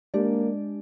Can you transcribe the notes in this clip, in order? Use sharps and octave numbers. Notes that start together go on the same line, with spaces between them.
G#3 A#3 D4 G4 D5